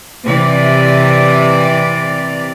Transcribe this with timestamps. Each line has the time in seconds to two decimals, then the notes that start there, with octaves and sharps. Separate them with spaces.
0.24 C3 E3 D5